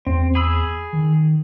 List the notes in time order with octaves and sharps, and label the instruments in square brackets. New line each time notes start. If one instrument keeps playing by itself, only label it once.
[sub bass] E2 [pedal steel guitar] C4
[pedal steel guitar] G#4 B5 E6
[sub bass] D#3